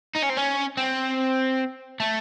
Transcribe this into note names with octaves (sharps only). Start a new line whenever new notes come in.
D#4
C#4
C4
C#4
C4
A3